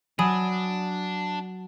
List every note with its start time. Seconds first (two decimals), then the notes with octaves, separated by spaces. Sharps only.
0.19 F#3 D4 G#5 B5 D#6 D#7